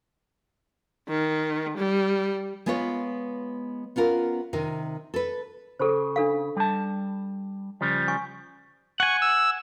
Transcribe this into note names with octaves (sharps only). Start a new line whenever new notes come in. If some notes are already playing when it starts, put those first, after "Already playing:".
D#3
G3
G#3 B3 F4 B4 C#5
B3 C#4 F4 A#4
C3 D#3 A#4
A4 B4
C#3 G#4 A4 C5
D4 A4 F5
G3 A5
C#3 F3 G3
G#5 C#6
F#5 G#5 C#6
E6